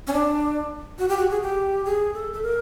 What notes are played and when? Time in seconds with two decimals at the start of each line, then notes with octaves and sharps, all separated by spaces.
0.07 C#4
0.13 D4
0.99 F#4
1.09 G4
1.17 F#4
1.30 G#4
1.42 G4
1.85 G#4
2.14 A4
2.33 A4
2.42 A#4